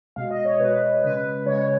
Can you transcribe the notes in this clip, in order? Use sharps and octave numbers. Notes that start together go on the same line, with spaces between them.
B2 G#3 F5
D#5
C#5
B2 G#3 B4
C#3 G#3 B4
C#3 G#3 C#5